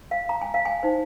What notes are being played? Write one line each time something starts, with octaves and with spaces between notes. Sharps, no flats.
F5
A#5
G#5
F5
G#5
D#4 C5